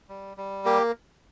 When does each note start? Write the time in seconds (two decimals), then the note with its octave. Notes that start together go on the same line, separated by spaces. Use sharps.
0.09 G3
0.37 G3
0.65 A#3 G4